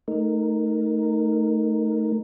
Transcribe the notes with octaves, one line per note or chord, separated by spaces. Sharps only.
A3 D#4 A#4